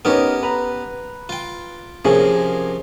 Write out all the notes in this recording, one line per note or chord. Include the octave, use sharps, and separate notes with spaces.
B3 C#4 D#4 G4 A#4
B4 A#5
F4 G5
C3 F3 A#3 C#4 G#4